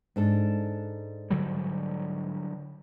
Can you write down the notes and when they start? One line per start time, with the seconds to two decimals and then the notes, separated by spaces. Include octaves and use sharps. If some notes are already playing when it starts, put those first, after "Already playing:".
0.16 G#2 D4 A4
1.30 D3 F#3 G3